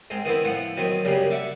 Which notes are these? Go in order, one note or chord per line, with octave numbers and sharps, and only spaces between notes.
G#2 C4
D#3 B3 C4 E4
A2 F3 F#5
D#3 F#3 B3 C4
F#2 C#3 G3 A#3
D5 E5 F#5 C#6